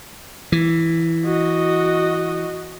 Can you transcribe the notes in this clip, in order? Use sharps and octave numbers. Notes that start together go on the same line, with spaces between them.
E3
F#4 D#5